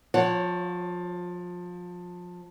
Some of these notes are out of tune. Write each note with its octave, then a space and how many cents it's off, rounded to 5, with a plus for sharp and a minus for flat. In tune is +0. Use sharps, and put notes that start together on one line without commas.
F3 +25 C#5 +0 F#5 +0